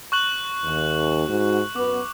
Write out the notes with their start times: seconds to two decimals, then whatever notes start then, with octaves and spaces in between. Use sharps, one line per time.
0.12 C#6 F#6 F#7
0.64 D#2
1.28 G#2 F#4
1.76 F#2 B3 D6